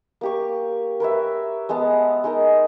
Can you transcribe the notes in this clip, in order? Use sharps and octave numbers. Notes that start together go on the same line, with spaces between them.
A#3 G4 C#6
A#4 B4 C#5 E5
G#3 B3 F#5 A5
G#3 D#4 A#4